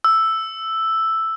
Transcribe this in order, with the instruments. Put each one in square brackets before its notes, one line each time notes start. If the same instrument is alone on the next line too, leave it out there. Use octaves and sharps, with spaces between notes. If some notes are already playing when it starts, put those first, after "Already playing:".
[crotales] E6